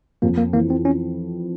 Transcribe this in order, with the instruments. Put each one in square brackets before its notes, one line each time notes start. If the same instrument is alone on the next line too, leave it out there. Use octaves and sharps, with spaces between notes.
[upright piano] F2 [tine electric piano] A#3
[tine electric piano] A#3
[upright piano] E3 [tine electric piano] A#3
[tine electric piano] C4
C#4